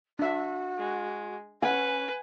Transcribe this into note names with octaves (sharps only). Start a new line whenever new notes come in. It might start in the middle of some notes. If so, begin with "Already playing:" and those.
D4 F#4 E5
G#3
C#4 B4 F#5 G#5